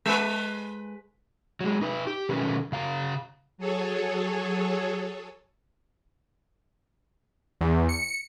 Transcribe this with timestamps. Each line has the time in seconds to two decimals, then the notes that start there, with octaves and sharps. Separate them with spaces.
0.06 G#3 B4
1.61 F#3 G#3
1.82 D#4 B4
2.07 G4
2.29 B2 D#3 F#3 C#4 A4 B4
2.72 C#3 F5 A#5
3.58 F#3 G#4 A4 C#5
7.61 E2
7.89 C#7